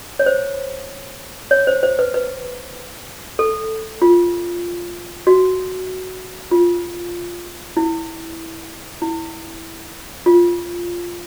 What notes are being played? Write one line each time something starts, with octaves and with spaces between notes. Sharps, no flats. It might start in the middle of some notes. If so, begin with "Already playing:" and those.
C#5
C5
C#5
C5
C5
B4
B4
A4
F4
F#4
F4
E4
E4
F4